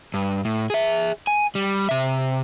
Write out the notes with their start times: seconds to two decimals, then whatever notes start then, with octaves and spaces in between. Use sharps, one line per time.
0.14 G2
0.45 A2
0.70 G#4 E5
1.27 G#5
1.55 G3
1.89 C3 E5